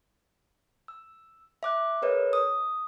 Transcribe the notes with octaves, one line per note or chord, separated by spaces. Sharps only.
E6
E5 D6 F#6
G#4 A#4 B4 C#5 D#5
D#6